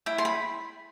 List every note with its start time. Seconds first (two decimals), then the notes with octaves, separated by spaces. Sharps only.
0.06 E4 G5
0.18 C6
0.25 B5